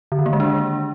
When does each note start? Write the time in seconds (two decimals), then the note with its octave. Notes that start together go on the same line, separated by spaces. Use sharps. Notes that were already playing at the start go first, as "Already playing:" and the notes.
0.12 D3
0.19 D#3
0.26 A#3
0.33 G#3
0.40 D4